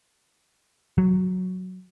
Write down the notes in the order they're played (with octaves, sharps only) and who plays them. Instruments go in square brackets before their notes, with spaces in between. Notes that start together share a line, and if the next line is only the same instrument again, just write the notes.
[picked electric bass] F#3